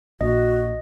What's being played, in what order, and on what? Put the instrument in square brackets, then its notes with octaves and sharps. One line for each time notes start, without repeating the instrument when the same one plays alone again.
[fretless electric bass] A#1 [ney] F#4 [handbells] D#5